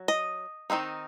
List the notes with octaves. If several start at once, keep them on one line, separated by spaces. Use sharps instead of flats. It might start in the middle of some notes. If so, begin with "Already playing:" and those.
Already playing: F#3
D#5
D#3 G#3 C4 D#4